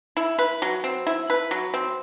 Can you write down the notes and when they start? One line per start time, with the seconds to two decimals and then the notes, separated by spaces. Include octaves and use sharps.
0.17 E4
0.39 B4
0.62 F#3
0.84 C4
1.07 E4
1.30 B4
1.51 F#3
1.74 C4